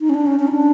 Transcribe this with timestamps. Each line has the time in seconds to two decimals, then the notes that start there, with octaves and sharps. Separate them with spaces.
0.01 D#4
0.10 C#4
0.14 D4
0.26 C#4
0.39 C#4
0.48 D#4
0.53 D4